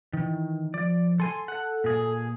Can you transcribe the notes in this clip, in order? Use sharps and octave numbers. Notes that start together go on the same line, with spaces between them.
D#3 E3
F3 D5
A4 G#5 C6
A4 F#5
A#2 G#4